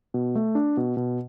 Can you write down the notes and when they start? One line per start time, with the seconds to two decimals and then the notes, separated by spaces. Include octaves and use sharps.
0.14 B2
0.35 A3
0.55 D4
0.77 B2
0.97 B2